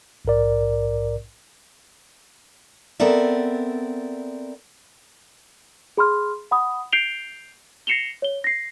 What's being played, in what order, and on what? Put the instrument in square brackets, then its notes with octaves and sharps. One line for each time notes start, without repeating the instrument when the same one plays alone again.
[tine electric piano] A#1 G#2 A#4 D5
[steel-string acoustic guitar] B3 C4 A4 A#4 D5 E5
[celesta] G#4 B5 C6 F6
F#5 B5 D#6
G6 C7 D7 F7 G7
A#6 C7 C#7 E7 F7 G7
C#5 G7
A#6 C7